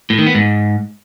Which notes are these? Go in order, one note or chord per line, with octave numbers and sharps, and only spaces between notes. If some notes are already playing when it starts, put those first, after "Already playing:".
A2
D#3
B3
G#2